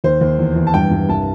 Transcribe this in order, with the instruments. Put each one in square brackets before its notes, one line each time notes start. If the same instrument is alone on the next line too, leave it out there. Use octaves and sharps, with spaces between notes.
[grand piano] D#2 C5
D#2
E2
E2
A5
G2 G5
G2
C2 A5